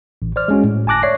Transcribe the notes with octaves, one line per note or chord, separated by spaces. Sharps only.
A1
C5 D5 F6
G#3 C#4 F#4
A2
G1 G#5 A5 D6 F#6 A#6
C#5 D5 E5 C7